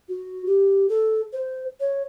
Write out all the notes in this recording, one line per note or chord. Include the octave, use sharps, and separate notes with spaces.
F#4
G4
A4
C5
C#5